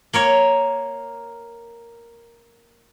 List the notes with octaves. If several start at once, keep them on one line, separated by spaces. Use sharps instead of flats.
A#3 A#4 C#5